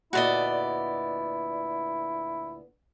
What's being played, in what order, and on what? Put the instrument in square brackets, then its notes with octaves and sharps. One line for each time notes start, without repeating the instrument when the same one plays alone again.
[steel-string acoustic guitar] D2 A#2 B3 [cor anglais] E4 [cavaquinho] F#4 D5 D#5